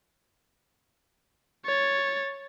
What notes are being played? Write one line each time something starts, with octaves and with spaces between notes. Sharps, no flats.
C#5 A6